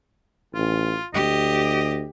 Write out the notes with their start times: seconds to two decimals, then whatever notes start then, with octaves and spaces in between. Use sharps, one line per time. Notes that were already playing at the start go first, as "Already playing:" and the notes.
0.55 A1 F4
1.14 D2 G4 D#5